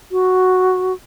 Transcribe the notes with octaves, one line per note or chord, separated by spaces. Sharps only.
F#4